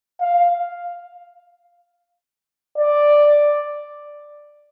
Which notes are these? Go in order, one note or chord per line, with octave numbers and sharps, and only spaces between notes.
F5
D5